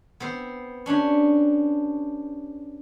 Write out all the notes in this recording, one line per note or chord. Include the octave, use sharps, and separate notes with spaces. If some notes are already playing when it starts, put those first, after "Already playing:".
B3 C4 C5
C#4 D4 G4 C#5